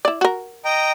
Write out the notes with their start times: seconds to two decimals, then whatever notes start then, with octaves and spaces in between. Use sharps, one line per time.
0.05 E4 D5
0.21 F#4 A#4
0.65 D#5 G5 A#5